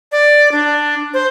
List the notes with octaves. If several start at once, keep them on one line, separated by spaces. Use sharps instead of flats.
D5
D4
C5